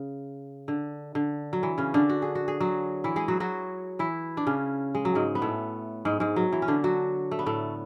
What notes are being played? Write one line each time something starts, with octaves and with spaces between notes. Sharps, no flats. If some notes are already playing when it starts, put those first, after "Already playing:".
Already playing: C#3
D3
D3
F#3
E3
C#3 C#4
D3 D4
F#4
G#4
F#4
G#4
F#3 F#4
E3 E4
G#3 G#4
F#3 F#4
F#3 F#4
E3 E4
D4
C#3 C#4
G#3
F#3
G#2 G#3
B3
A2 A3
G#2 G#3
G#2 G#3
F#3
E3
C#4
D3 D4
F#3 F#4
A3
B3
A2 A3